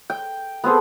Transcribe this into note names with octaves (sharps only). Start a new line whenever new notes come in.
G5
B3 C4 G#4 A4